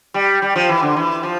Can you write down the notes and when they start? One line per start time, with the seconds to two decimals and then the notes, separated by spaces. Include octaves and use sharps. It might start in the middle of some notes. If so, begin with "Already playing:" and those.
0.14 G3
0.42 G3
0.56 F3
0.69 E3
0.82 D3
0.96 E3
1.23 F3